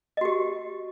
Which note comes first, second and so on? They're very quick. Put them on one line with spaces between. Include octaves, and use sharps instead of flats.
D#5 F#4 G4